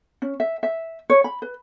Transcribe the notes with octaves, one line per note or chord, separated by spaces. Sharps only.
C#4
E5
E5
C#5
B5
B4